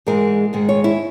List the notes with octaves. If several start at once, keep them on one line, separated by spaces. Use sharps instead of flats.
G#2 E3 G#3 A#4
G#2 D#3 G#3
C#5
E4